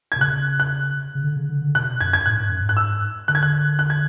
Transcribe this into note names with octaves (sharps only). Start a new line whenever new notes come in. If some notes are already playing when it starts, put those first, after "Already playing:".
G#6
B2
C#3 F#6
F#6
C#3
D3
C#3
D3
D3
B2 F#6
F#2 G#6
G#6
A2 F#6
G#2
F#2
G#2
F#6
E6
D3 F#6
G#6
F#6
F#6
G#6